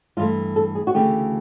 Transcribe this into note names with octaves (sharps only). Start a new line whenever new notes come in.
G2 E3 A3 F4
A4
G#4
F#4
D2 C#3 E3 A3 G4